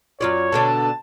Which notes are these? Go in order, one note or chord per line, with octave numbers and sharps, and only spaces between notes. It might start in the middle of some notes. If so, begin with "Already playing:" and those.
F#2 F4 C#5 D5
B2 D3 D4 A5